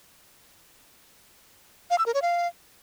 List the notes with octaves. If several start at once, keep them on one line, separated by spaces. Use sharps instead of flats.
F5
E6
A#4
C#5
F5